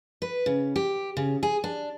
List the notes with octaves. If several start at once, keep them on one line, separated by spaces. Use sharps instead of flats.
B4
C#3
G4
C#3
G#4
D4